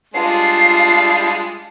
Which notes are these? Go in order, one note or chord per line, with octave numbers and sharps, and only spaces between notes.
G3 G#3 D4 F4 A5 C7